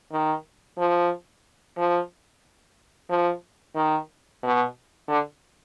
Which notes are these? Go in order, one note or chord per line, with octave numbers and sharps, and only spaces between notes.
D#3
F3
F3
F3
D#3
B2
D3